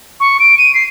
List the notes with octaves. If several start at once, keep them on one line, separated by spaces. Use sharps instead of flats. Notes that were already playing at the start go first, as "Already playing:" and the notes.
C#6
D7
D#7
C7